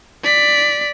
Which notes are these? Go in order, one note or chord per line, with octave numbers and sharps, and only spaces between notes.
D5 B6